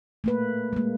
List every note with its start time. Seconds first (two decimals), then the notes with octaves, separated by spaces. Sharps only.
0.24 A3 A#3 B4
0.73 G#3 A#3